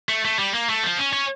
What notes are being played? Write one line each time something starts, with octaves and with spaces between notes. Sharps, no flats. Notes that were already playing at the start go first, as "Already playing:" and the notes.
A3
A3
G3
A#3
A3
F3
C#4
C#4